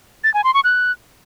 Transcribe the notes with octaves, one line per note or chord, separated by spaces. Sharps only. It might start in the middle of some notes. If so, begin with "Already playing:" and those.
A6
G#5
C6
C#6
F#6